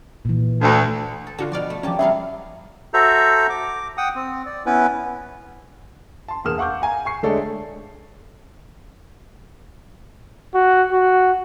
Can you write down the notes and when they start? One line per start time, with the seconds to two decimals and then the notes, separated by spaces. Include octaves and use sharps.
0.25 A#2 E3
0.61 D2
1.27 A4
1.38 D3 F4 F#4 A4
1.52 B2 F3 F#4 D5 F6
1.70 A3
1.83 F3 A#3 C#4 G4 A5
1.99 C#3 F#3 G3 B3 G#4 E5 F5
2.94 F#4 A4 C5 E5 A#5
3.50 D6
3.97 F#5 G5 D#6
4.15 C4
4.46 D5
4.66 B3 C#4 E4 B4
6.28 A5 C6
6.45 E1 E2 A#3 D#6 F6 E7
6.58 F5 F#5 C#6 D6 G6
6.82 F5 G#5 A#5
7.05 G#5 C#6 C7
7.23 D3 G#3 A3 A4 C#5 D5
10.54 F#4
10.92 F#4